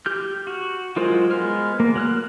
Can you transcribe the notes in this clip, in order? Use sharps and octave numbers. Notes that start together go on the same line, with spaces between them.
G4 F6 G6
F#4
F#3 G#3 F4 A#4 C5
G#3 B3 F6
A#3
F#3 F6 F#6